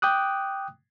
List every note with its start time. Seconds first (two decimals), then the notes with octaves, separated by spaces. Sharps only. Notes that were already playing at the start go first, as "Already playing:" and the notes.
0.02 G5 D6 D#6 F#6